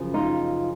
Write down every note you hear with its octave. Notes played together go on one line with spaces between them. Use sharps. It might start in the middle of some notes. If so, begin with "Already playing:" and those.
Already playing: F#2 C#3 F3
D#4 F4